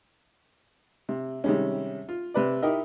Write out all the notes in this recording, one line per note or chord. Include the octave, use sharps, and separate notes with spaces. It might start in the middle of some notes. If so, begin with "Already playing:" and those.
C3
C3 D#3 G3 G#3 C#4
F4
C3 B4 D5
D#4 E4 G4 A#4 D#5 E5